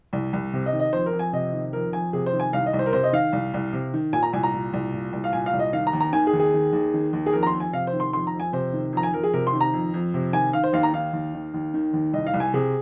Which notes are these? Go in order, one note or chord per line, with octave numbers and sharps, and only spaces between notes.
C2
C2
C3
D#5
D#3
D#5
F2 C5
A#4
F2
G#5
C3 D#5
D#3
F2 A#4
F2 G#5
C3 G#4
C5
D#3
G#5
C2 F5
D#5
C2
C5
A#4
C3 C5
D#5
D#3 F5
C2
C2
C3
D#3
A#2 G#5
A#5
C2 G#5
A#5
A#2
C2
A#2
C2
F5
A#2 G#5
F5
C2
D#5
D#3 F5
A#5
D#2
A#5
D#3 G#5
G#4
D#2
G#4
D#3
D#2
D#3
D#2
G#4
F2 A#4
A#5
C6
F2
G#5
C3 F5
C5
D#3
C6
F2 C6
A#5
F2
G#5
C3 C5
D#3
F2 A#5
G#5
F2 A#4
G#4
C3 A#4
C6
D#3
A#5
F2
F2
C3
D#3 G#5
D#3 F5
C5
D#2 F5
A#5
D#3 F5
D#2
D#3
D#2
D#3
D#2
C2 D#5
F5
C2
G#5
C3 G#4